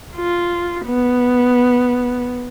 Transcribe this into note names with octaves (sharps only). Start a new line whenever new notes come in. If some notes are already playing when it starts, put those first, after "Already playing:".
F4
B3